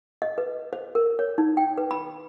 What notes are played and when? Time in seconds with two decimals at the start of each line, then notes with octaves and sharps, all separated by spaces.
0.22 D#5
0.38 B4
0.73 C5
0.95 A#4
1.19 C#5
1.38 D#4
1.57 G5
1.78 B4
1.91 B5